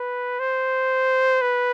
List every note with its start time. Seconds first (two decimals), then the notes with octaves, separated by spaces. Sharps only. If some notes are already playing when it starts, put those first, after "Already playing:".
Already playing: B4
0.39 C5
1.41 B4